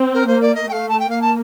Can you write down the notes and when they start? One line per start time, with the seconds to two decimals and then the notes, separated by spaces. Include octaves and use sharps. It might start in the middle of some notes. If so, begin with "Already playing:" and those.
Already playing: C4
0.14 A#4
0.26 A#3 C5
0.41 D5
0.54 D#5
0.67 A3 G5
0.72 F5
0.88 A5
0.99 G5
1.09 A#3 F5
1.21 A5